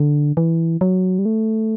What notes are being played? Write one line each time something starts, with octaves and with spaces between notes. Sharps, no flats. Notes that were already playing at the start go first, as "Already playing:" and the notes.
Already playing: D3
E3
F#3
G3
A3